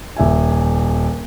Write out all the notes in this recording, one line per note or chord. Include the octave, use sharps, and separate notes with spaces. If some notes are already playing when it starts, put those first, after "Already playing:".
D#1 E5 G#5